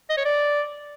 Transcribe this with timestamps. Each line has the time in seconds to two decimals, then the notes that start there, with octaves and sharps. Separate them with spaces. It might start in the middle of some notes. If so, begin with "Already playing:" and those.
0.10 D#5
0.17 C#5
0.25 D5